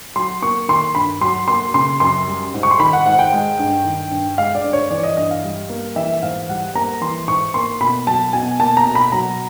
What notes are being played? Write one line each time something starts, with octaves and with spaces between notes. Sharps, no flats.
F#3 C6
A#3 C#6
D#3 C6
G2 B5
F#3 C6
A#3 C6
C#3 C6
F#2 C6
G3
G#2
C#6
C6
D#3 B5
F#5
G#2 F#5
G5
G#3
G2
D#3
G2
G#3 F5
D5
G2
C#5
E3 D5
D#5
G2 D#5
F5
G3
A#3
E3 E5
G#2 F5
G3 F#5
A#3 A#5
E3 C6
G#2 C#6
A#3 C6
B2 B5
F#3 A5
B2 G#5
A#3 A5
A#5
B2
B5
F#3 A#5